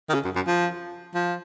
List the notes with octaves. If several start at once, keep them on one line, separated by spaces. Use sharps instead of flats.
D#3
C#3
F#2
F#2
F3
F3